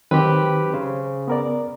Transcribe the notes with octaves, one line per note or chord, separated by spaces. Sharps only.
D#3 F#3 C4 G4 B4
C#3 C5
B3 A#4 D5